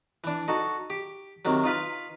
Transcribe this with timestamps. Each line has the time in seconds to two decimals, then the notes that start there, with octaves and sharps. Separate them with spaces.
0.24 E3 D4
0.48 D#4 F#4 A4
0.90 G4
1.45 C3 D#3 F#3
1.64 D#4 F4 B4 F5